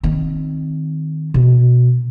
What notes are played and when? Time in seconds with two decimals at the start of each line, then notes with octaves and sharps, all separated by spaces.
0.03 D#3 C4
1.34 B2